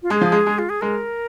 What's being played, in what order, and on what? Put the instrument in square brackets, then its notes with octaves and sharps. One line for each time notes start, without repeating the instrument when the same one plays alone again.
[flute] F4
[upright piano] G#3 [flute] G#4
[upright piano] F3
G#3
G#3
[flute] F4
G#4
[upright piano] G#3 [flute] A#4